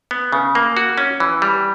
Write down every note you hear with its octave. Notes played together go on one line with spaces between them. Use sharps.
B3
C#3
A#3
F#4
C#4
E3
G3